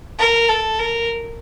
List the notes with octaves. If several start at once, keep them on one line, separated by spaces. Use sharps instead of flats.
A#4
A4
A#4